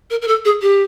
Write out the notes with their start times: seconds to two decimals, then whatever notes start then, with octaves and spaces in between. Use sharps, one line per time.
0.10 A#4
0.22 A#4
0.28 A4
0.45 G#4
0.62 G4